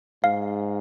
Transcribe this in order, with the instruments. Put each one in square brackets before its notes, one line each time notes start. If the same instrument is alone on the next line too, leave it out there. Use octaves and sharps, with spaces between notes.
[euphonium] G#2 [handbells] F5